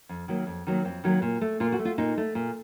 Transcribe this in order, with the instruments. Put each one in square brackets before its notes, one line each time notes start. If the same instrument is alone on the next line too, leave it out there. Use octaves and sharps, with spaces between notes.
[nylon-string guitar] F2
D#3 F#3 A#3
F2
D#3 F#3 A#3
F2 C4
D#3 F#3 A#3
A#2
A3
A#2 F4
F#4
A3
F4
A#2 D#4
A3
A#2